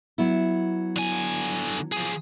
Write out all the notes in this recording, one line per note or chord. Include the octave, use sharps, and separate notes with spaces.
F#3 B3 E4
D3 G#5
F3 G#4